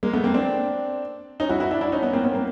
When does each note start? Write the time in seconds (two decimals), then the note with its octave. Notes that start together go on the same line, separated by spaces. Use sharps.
0.03 G#3 A#3
0.13 A3 B3
0.24 A#3 C4
0.34 C4 D4
1.40 C#4 D#4
1.49 E4 F#4
1.60 E4 F#4
1.71 D4 E4
1.81 D4 E4
1.92 C#4 D#4
2.03 B3 C#4
2.13 A#3 C4
2.24 B3 C#4
2.34 A#3 C4